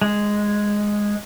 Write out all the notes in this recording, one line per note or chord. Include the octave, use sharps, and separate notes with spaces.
G#3